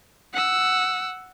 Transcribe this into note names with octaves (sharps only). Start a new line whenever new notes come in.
F#5 E6